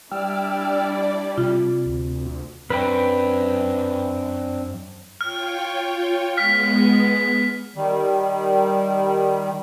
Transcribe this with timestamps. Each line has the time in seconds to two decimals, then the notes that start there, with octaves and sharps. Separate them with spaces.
0.12 G3 D4 E4 D5 G5 E6 F6
1.38 C3 F4
1.86 D2
2.70 F#2 C4 D4 B4 G5
5.21 F4 C#5 G5 F6
6.37 G#3 B3 F6 B6
7.76 D#3 G3